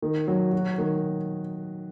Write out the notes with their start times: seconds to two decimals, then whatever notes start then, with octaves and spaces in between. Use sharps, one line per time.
0.02 D#3
0.28 F#3
0.53 F#4
0.78 D#3